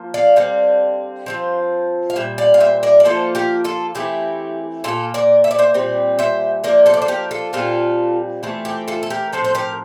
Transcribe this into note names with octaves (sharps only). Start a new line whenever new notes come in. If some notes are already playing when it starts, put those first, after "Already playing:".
Already playing: F3 A#3 F4
D5 F5
D3 G3 C4
F3 C4 F4
F5
A#2 G3 E5
D5 F5
F5
C5 E5
A#4 D5
D5
F3 A#3 F4 A4 C5
G4 A#4
F4 A4
E3 A3 C4 E4 G4
A#2 G3 A#3 F4 A4
A#4 D5
E5
D5
C5 E5
A#2 G3 C4
C5 E5
F3 A#3 D4 A#4 D5
A4 C5
D5
C5
G4 A#4
F4 A4
A#2 G3 C4 F4 A4
E3 A3 C4 F4
G4
F4 A4
A4
G4 A#4
A2 F3 C4 A4 C5
C5
G4 A#4